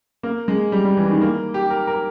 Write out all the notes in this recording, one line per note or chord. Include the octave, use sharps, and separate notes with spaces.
A#3
G#3
G3
G3
E3
D#3
A#3
G4
A#4
A#4